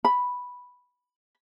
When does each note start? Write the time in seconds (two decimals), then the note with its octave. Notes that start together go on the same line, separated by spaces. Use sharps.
0.05 B5